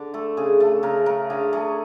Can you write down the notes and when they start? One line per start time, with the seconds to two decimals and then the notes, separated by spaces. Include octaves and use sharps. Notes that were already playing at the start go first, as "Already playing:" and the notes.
Already playing: D3
0.14 A3 A4
0.37 C#3 G#4
0.60 A3 A4
0.83 C#3 A#4
1.06 A3 A#4
1.30 D3 G#4
1.53 A3 G#4